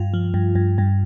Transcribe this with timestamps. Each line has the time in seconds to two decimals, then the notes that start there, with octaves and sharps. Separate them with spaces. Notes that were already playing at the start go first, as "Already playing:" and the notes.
Already playing: G2 F4
0.14 F3
0.34 G2
0.55 G2
0.78 G2